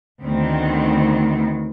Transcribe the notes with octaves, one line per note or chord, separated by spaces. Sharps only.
D2 D#3 B3 C4